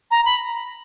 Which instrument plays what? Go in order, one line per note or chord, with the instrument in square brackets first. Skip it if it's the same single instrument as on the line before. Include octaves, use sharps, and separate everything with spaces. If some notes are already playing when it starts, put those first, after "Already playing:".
[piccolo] A#5
B5